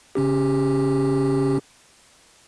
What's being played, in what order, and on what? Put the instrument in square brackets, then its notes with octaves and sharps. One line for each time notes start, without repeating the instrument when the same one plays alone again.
[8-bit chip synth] C#3 C#4 G4